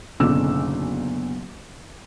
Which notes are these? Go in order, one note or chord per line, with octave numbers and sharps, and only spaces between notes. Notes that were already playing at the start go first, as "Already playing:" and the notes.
F#1 B1 D3 D6 E6